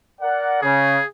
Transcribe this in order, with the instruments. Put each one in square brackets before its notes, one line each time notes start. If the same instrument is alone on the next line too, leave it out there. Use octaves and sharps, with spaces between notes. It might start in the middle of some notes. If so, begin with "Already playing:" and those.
[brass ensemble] A#4 D5 F#5
[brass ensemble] C#3 [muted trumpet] G#4